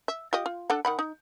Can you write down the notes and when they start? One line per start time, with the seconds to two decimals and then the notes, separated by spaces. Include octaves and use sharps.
0.08 E5
0.33 F4 G4 D#5
0.46 F4
0.70 D4 A4 F#5
0.85 D#3 F#5 B5
0.99 D#4